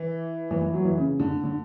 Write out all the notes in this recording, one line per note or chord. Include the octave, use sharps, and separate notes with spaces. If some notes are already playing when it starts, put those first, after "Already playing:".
Already playing: E3
E3
E3
F#3
E3
C#3
D3
D3